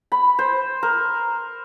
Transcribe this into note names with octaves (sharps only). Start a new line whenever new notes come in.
B5
C5
A#4